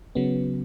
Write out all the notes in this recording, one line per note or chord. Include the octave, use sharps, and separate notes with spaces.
C#3 F#3 B3